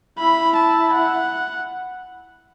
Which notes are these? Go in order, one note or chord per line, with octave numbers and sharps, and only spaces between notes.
E4 B5
A5
F#5